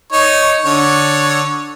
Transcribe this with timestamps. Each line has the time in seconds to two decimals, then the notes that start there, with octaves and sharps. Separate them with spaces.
0.13 D#4 C#5
0.66 D3 C#5